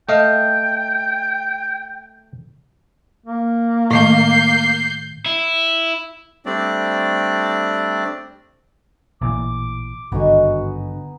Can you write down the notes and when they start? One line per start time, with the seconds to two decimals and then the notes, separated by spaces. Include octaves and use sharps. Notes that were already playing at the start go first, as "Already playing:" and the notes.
0.09 A3 D#5 F5 G5
3.26 A#3
3.91 A2 D#3 A3 G6 C7
5.26 E4
6.46 G3 A3 C4 D4 D5
9.22 A1 A#2 E3 D6
10.12 G#1 G2 D3 B3 D#4 F#4 G#5